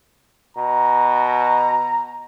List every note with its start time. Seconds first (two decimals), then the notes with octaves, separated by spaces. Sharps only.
0.57 B2 A#5